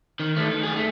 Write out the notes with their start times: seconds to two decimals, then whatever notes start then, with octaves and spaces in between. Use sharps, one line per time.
0.20 D#3
0.36 E3 A3
0.51 D#3
0.63 F#2 G#4
0.76 A3